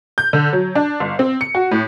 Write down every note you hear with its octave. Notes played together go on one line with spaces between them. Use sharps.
G6
D3
F#3
D4
G1
C4
C#7
F#4
A2